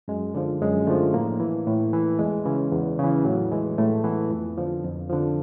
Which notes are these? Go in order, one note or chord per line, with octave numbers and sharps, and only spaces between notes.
F#2 G#3
D3 F3
F#2 G#3
D3 F3 A3
A2 A#3
E3
A2
E3
E2 G#3
C#3 E3
E2
C#3 E3
A2 F#3
E3 G#3
A2 A3
E3 B3
F2
D3 F3
F2
D3 F3